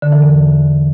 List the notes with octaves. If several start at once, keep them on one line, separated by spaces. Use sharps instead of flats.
D3
E3
E2